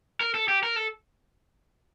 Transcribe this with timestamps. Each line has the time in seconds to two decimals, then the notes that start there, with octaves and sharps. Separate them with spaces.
0.21 A#4
0.35 A4
0.48 G4
0.63 A#4
0.76 A4